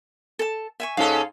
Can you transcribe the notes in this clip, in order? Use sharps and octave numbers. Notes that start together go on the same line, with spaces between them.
A4 A5
E5 G#5 C#6
G#2 C#4 A4 F5